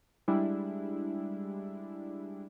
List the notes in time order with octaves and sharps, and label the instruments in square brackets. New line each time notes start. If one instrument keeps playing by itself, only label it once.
[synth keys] G3 G#3 D4 E4